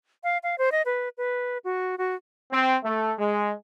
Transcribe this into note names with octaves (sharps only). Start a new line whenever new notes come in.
F5
F5
C5
D#5
B4
B4
F#4
F#4
C4
A3
G#3